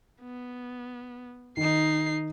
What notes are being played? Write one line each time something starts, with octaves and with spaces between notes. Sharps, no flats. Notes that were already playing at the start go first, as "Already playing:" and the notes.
B3
D#3 D#4 C7